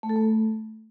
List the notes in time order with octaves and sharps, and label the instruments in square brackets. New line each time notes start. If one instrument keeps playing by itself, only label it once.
[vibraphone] A3
A4
A3